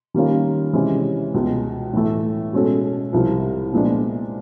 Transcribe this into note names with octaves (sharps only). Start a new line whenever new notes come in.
D#3 G3 A#3 C#4 F4
C3 E3 G#3 C#4
C#2 B2 G#3
A2 E3 A3
B2 G#3 C#4 F#4 A4
C2 C3 F3
A#2 F3 G#3 B3 D4